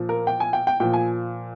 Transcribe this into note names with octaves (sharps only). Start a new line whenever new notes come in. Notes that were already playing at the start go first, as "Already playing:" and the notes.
Already playing: A#2 F3
A#4
G5
G#5
G5
G5
A#2 F3 G5
G#5